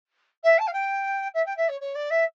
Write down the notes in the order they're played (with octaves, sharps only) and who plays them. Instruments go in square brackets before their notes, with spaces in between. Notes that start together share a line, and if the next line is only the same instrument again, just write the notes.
[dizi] E5
A5
F5
G5
E5
G5
E5
C#5
C#5
D5
E5